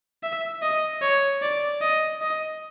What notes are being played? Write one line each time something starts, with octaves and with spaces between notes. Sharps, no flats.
E5
D#5
C#5
D5
D#5
D#5